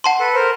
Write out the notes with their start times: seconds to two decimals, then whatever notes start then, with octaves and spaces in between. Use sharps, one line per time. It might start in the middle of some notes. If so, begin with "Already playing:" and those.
0.04 F#5 A5 C6
0.20 A4 B4
0.34 A#4 C5